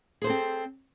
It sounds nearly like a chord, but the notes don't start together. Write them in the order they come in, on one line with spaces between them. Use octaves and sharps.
G#4 C5 A4 C4